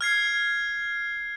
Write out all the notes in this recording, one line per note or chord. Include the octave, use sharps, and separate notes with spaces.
F6 G#6 C7